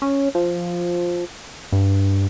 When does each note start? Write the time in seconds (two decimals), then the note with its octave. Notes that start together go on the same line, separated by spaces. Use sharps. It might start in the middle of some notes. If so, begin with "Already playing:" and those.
0.02 C#4
0.35 F3
1.72 G2